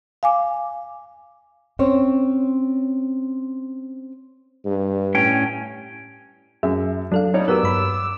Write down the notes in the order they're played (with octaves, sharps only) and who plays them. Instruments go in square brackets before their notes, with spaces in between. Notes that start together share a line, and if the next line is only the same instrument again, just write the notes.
[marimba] F5 G#5 D6
[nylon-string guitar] C4 C#4 C5 C#5
[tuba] G2
[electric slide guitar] A2 C#4 G5
[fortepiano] F#2 E5 [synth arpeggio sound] G#4
[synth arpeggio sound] F#3 A4 F5 [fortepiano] D4
[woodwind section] F#2 B2 G3 [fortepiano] D#4 C#5 D5
[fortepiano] F#3 B3 [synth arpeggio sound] G4 A#4 [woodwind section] D6 E6
[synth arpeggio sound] G2 B5